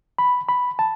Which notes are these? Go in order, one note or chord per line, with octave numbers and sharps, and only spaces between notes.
B5
B5
A5